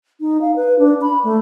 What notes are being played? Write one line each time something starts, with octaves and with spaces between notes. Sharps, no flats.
D#4
F5
B4
D4
B5
A3